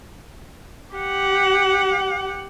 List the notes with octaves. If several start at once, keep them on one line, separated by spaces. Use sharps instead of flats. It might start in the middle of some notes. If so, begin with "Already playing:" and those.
G4 F#5